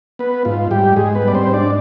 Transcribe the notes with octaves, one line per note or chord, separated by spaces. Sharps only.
B3 B4
G#2 F4
G#2 G3 G4
G#2 G#3 G#4
B3 B4
G3
D5
C4 C5
G#2
D4 D5